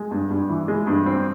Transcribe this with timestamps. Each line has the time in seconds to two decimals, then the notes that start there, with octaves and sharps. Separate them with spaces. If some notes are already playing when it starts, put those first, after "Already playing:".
Already playing: G#3
0.11 G2
0.31 G2
0.49 E3
0.68 G#3
0.87 G2
1.06 C4